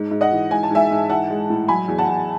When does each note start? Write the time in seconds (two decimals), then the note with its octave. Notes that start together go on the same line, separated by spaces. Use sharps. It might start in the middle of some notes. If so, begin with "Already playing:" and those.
Already playing: G#2
0.11 G#2
0.21 D#5 F#5
0.32 E3
0.51 G#2 G#5
0.63 A5
0.71 G#2 E5 G#5
0.91 G#2
1.09 E3 F#5 A5
1.30 G#3
1.50 A2
1.68 F#3 G#5 B5
1.88 E2
1.98 F#5 A5
2.08 E2